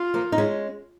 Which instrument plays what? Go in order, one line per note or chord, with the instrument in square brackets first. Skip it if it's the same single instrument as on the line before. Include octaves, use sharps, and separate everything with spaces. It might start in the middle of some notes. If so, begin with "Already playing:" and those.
Already playing: [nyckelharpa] F4
[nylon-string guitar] F3 A#3
D#4
G#3 C#4